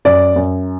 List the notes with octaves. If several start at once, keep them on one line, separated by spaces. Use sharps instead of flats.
F#2 D5
F#2